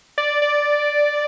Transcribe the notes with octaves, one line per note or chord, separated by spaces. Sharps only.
D5
D5